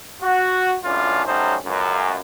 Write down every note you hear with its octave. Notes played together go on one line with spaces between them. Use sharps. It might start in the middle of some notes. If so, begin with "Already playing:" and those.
F#4
C#2 F#2 A2 C#4 D4 F4
F#3 G3 A3 C#4 D#4 C5
C#2 F#2